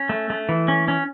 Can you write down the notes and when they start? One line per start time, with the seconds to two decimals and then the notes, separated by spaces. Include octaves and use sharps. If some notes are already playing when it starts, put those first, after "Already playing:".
Already playing: C#4
0.09 A3
0.30 A3
0.49 E3
0.68 C#4
0.88 C#4